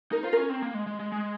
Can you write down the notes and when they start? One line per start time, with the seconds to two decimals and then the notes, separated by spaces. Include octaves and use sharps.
0.12 D#4 A#4
0.23 F4 C5
0.33 C#4 A#4
0.50 C4
0.62 A#3
0.74 G#3
0.87 G#3
1.00 G#3
1.12 G#3